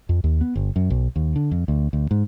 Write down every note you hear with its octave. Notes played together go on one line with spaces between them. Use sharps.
F2
D#2
B3
G1
F#2
B1
D#2
D3
F2
D2
D2
G#2